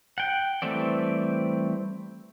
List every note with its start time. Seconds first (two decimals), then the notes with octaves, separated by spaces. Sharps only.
0.18 F#5 G5
0.62 E3 G3 A3 C4 D5